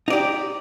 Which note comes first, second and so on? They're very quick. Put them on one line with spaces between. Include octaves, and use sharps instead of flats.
D#4 D5 G4